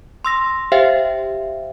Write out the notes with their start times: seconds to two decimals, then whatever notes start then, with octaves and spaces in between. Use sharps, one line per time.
0.25 C6 E6 A#6
0.72 G4 C5 E5 F5 G5